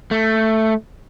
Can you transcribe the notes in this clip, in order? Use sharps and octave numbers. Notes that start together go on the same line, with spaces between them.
A3